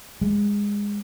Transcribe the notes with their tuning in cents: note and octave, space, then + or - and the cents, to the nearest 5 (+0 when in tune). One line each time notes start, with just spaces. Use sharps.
G#3 -20